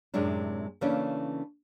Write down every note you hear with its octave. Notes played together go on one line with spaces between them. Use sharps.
F#2 A2 C3 G#3 C#4 D4
C#3 E3 A3 A#3 C#4 D4